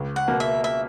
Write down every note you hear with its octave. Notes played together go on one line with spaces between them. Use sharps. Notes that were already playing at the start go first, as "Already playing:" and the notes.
Already playing: C#2
F#5
B2 A#3
E5
E5